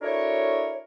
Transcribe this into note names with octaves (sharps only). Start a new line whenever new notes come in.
D4 E4 F#4 A4 A#4 C#5